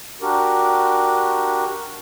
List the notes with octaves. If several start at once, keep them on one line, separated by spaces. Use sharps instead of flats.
D4 F#4 G4 A#4